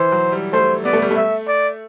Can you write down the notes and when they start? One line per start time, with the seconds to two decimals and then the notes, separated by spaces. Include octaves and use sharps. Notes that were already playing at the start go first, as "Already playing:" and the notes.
Already playing: E3 C5
0.12 F#3
0.32 G3
0.53 A3 C5
0.85 B3 D5
0.93 A3
1.02 G3
1.11 A3
1.16 E5
1.48 D5